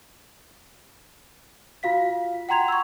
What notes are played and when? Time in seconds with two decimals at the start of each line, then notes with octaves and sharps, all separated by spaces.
1.83 F4 F#4 F5 B6
2.49 F#5 G5 A#5 C6 G#6 F7
2.68 C#6 E6